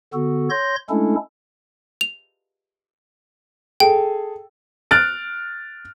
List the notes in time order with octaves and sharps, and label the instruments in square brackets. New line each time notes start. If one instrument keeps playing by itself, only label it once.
[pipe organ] D3 B3 F#4 A4
C#5 C6 G6 A#6
G#3 A3 C#4 D4 E4 A4
[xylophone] F7
[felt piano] G#4 A4 [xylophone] G5
[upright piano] F6 F#6 A6 D7